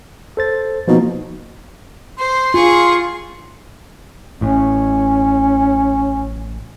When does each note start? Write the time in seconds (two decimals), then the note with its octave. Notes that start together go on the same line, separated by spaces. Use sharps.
0.37 A4 C5 A6
0.88 B2 F3 A#3 D#4
2.19 C5 C6
2.54 F4 G#4 C#6
4.41 A1 A2 C#4